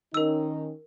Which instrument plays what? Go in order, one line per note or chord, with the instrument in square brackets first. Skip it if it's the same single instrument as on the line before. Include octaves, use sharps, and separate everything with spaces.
[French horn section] D#3 C#4 D#4 [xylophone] A#4 E6